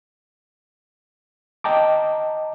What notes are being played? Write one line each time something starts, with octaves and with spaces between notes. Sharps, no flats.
D#5 G5 A5 A#5 D6